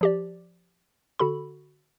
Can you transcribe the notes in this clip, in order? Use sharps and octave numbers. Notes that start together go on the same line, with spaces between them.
F3 G4 D5
D3 F#4 A4 B5